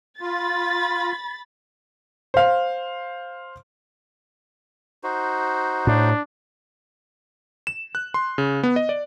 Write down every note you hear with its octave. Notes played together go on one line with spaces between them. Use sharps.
F4 B5 A6
C5 F5
D#4 F#4 C5
A2 D4
E7
F#6
C6
C#3
B3
D#5
D5